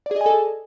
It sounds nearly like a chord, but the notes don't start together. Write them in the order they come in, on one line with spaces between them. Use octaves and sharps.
D5 G#4 D#5 G#5 A4